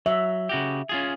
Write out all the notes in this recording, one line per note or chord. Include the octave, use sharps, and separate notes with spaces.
F#3 E5
C#3 F#4 G4
C#4 F4 G#4